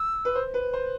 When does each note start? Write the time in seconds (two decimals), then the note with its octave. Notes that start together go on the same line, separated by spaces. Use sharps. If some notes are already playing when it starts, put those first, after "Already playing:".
Already playing: E6
0.25 B4
0.35 C5
0.54 B4
0.73 C5